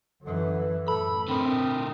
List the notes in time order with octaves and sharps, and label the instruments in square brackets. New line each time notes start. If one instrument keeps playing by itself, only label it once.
[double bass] F#2 E3 [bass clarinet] D3
[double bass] F#2 A2 [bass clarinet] A4 [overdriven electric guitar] B5
[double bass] A2 [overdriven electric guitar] D3 A#4 [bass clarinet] C4